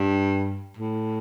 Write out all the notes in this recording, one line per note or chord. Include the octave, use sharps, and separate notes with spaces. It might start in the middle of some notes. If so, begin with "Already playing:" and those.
Already playing: G2
A2